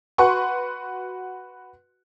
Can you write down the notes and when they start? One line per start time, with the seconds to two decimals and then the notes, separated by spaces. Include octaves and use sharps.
0.18 F#4 B4 F#5 C6 C#6